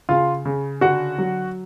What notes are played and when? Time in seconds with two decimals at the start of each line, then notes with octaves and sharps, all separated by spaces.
0.09 C#3 F4 F5
0.45 C#3
0.81 D3 F#4 F#5
1.18 F#3